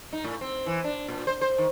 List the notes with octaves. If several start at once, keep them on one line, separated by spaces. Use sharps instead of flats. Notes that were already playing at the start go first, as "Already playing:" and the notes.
D#4
A2
C4
E3
D4
A#2
C5
C5
D#3